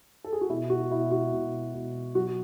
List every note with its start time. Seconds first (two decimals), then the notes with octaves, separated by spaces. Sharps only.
0.24 A4
0.33 G#4
0.41 F#4
0.49 B2 E4
0.70 F#4
0.91 B2 E4
1.11 F#4
1.32 B2
1.74 B2
2.15 F#3 F#4